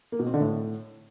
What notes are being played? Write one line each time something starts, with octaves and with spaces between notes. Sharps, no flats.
A#3
B2
C4
D3
A2